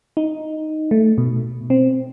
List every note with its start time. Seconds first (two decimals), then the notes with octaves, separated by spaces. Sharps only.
0.17 D#4
0.91 A3
1.18 B2
1.70 C4